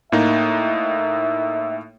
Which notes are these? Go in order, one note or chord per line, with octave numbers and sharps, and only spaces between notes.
A2 A#3 D#4 E5